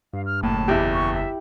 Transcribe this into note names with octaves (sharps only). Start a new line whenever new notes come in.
G2 F5
F6
F#1 D#2 A2 A5
B1 E2 E4 G4
C#6
E5